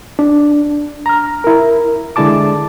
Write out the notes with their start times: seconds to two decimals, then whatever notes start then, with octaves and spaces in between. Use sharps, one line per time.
0.19 D4
1.06 A#5 F6
1.44 E4 A#4
2.16 D3 G#3 E4 D5 A5 D6